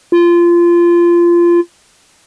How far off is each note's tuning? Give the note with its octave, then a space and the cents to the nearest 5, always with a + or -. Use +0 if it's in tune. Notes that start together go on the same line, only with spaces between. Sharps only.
F4 -20